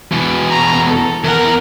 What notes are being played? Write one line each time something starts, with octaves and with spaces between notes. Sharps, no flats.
E2 B2
A#5
A4
E2 A#4 F#5